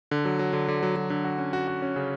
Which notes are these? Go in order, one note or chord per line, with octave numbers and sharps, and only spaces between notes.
D3
F#3
F#3
D3
D3
F#3
F#3
D3
F#4
C#4
F#4
F#4
C#4
C#3